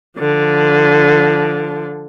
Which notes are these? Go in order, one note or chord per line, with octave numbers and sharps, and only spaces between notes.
D3 F3